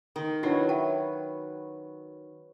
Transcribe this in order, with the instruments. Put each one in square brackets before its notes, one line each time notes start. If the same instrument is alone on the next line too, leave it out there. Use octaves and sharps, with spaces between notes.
[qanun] D#3
[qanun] F#3 [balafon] D4 E4 D#5 [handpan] F#4 B4 C#5
[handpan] C#5 [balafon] E5 G5